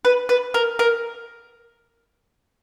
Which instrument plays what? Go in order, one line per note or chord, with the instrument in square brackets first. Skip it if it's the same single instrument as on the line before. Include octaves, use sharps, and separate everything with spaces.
[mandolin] B4
B4
A#4
A#4